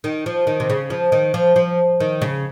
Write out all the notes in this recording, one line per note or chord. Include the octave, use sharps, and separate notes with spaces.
D#3
F3
D#3
C3
C#3
F3
D#3
F3
F3
D#3
C#3